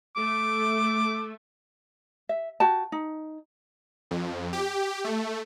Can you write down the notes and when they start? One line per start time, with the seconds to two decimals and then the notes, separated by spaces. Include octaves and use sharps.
0.16 A3 D6
2.29 E5
2.60 F#4 G5 A5
2.92 D#4
4.11 F2
4.53 G4
5.04 A3